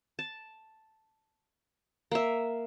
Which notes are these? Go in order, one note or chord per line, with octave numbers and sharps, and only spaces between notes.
A5
A#3 E5